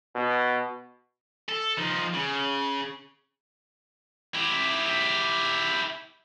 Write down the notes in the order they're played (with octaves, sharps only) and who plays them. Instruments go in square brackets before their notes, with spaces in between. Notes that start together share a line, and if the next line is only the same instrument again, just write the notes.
[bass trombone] B2
[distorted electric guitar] A4
F3 D#4
C#3
E4 G4